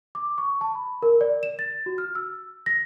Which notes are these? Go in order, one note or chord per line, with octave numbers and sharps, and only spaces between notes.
D6
C#6
A5
B5
A#4
D5
E7
A6
F#4
F6
E6
A#6